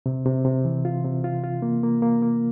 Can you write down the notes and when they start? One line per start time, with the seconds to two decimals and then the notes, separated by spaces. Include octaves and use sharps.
0.06 C3
0.25 C3
0.45 C3
0.65 E3
0.85 F4
1.05 C3
1.24 F4
1.44 F4
1.62 A#3
1.83 A#3
2.02 A#3
2.22 A#3